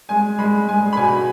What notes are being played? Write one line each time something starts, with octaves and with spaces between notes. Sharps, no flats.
G#3 G#5
G#3 B5
G#3 G#5
B5
B2 G#5